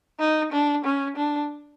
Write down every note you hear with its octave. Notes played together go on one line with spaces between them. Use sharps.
D#4
D4
C#4
D4